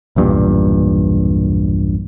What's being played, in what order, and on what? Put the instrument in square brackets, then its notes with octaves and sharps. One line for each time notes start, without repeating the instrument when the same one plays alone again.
[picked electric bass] B1 E2 G2 A#2